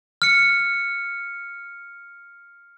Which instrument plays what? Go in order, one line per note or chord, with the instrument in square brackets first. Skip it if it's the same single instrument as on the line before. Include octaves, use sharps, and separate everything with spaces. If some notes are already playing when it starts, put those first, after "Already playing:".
[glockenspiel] F6 C#7